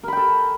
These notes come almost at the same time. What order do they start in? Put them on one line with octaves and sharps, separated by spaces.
A#4 B5 G5 A4